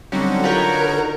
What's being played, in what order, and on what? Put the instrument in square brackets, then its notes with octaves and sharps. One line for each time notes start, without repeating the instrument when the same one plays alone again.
[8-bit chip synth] D3 D#4 F#4 [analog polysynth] F#3 G3 C4 [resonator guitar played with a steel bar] C#4
[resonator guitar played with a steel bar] F4 G4 [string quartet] A#4 [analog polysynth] B4 C#5